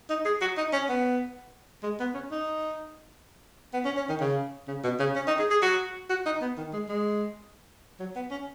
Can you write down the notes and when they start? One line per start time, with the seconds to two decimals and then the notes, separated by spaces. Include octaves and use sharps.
0.10 D#4
0.25 G#4
0.41 F#4
0.57 D#4
0.73 C#4
0.89 B3
1.83 G#3
2.00 B3
2.15 C#4
2.31 D#4
3.73 B3
3.85 C#4
3.97 C#4
4.09 D#3
4.20 C#3
4.68 C#3
4.84 B2
4.99 C#3
5.15 C#4
5.28 D#4
5.39 G#4
5.51 G#4
5.62 F#4
6.10 F#4
6.26 D#4
6.41 B3
6.58 D#3
6.73 G#3
6.89 G#3
8.00 F#3
8.16 B3
8.31 C#4